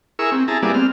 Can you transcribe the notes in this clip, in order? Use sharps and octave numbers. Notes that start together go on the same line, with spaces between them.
E4 G#4 A#4 C#6 E6
C4
E4 G#4 A5 A#5
G3 A#3 B3 E4 G#4 D5
C4 F6